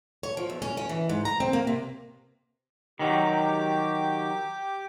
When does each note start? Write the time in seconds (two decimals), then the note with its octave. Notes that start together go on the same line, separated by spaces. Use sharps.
0.23 C#5
0.37 F3
0.50 E2
0.62 C#4
0.77 C#4
0.89 E3
1.09 G#2
1.25 A#5
1.40 C4
1.53 A#3
1.67 C3
2.99 D#3 F#3 G4 D6